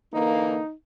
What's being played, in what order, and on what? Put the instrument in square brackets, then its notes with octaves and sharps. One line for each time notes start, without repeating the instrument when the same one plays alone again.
[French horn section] D3 E3 A#3 [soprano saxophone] D#4